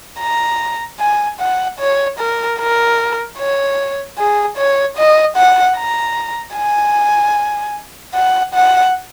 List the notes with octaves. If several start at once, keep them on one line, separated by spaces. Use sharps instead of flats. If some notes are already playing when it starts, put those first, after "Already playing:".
A#5
G#5
F#5
C#5
A#4
A#4
C#5
G#4
C#5
D#5
F#5
A#5
G#5
F#5
F#5